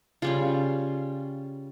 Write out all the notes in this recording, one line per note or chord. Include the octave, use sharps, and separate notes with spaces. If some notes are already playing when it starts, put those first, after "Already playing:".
C#3 G3 C#4 F4